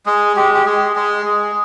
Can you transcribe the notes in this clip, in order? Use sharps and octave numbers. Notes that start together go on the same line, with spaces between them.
G#3 G#4
G#3 G4
G4
G#3 G#4
G#3 G#4
G#3